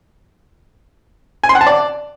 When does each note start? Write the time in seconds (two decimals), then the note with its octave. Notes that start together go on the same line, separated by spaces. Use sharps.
1.44 G#5
1.49 C6
1.55 F#5
1.61 A5
1.67 D5